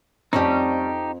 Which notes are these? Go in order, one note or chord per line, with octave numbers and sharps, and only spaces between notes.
F2 G3 A3 C4 C#4 D#4 G4